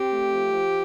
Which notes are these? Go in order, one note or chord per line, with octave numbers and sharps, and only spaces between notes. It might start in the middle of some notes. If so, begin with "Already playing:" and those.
Already playing: C4 G4
A3
F3
F3